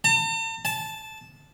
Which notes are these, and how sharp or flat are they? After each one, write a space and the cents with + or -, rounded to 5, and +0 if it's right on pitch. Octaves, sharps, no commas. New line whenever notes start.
A5 +45
A5 -10